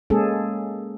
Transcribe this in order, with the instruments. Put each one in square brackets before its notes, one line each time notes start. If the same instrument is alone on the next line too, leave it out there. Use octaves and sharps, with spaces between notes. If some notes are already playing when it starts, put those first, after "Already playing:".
[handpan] G#3 A#3 C#4 G#4 A4